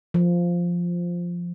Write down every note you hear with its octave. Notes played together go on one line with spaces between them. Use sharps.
F3